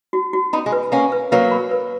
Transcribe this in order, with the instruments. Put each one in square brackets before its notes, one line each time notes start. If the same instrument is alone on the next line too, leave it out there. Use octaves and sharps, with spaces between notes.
[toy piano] F#4
F#4
[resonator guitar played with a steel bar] B3 D#4 [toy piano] B5
[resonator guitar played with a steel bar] G#3
[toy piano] B4
[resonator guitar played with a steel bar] A#3 C#4 [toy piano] F#5
[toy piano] B4
[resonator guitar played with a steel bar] F#3 A#3 [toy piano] B4
[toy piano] B5
B4